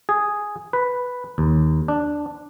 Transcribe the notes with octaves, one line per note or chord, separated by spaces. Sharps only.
G#4
B4
D#2
D4